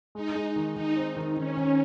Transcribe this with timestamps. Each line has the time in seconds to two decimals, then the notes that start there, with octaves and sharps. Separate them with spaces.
0.15 G#3 D#4
0.35 G#3
0.56 D#3
0.76 D#3 D#4
0.96 C4
1.16 D#3
1.36 D#3 C#4
1.57 D#3